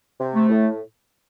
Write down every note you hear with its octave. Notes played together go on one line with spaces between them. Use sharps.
C3
A3
A2